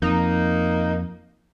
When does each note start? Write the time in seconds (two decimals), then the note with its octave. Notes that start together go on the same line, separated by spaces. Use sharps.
0.02 F2 A#3 D#4